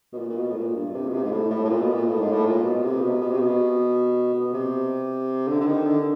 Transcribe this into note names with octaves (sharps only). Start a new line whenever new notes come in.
B2
A#2
A#2
B2
A2
A#2
G2
C3
B2
C3
G#2
A2
A2
A2
A#2
B2
A#2
A2
G#2
A2
A#2
B2
C3
B2
B2
C3
B2
B2
C3
D3
D3
D#3
D3